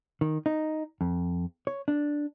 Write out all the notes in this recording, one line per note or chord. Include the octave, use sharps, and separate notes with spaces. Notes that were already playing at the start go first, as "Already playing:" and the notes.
D#3
D#4
F2
C#5
D4